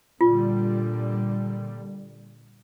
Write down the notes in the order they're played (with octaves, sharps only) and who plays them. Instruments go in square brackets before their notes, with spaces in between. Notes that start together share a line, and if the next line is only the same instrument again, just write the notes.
[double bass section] A#2 D3 G3 [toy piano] F4